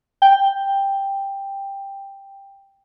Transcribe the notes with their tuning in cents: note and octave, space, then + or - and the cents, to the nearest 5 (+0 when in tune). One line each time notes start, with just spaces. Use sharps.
G5 +5